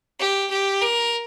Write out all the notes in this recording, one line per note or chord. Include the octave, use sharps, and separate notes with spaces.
G4
G4
A#4